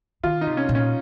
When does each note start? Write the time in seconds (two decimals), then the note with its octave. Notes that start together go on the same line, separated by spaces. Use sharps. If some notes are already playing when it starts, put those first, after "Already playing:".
0.24 D#3 F4
0.41 D#4
0.47 C3
0.57 C#4
0.69 A#2
0.75 C#4